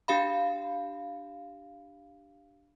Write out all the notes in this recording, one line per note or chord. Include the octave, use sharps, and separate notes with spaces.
D4 G4 F5 B5